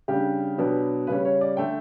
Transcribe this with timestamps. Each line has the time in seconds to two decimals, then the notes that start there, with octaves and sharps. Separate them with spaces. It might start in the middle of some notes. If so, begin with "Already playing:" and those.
0.08 C#3 G3 D4 G4
0.58 B2 F#3 B3 D4
1.07 C#3 G3 C#4 B4
1.25 C#5
1.41 D5
1.57 D3 A3 G5